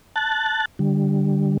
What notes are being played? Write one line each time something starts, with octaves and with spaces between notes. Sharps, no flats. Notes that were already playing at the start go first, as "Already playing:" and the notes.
A5 F#6 A6
D3 G3